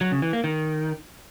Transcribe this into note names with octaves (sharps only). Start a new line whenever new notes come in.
F#3
C#3
E3
A#3
D#3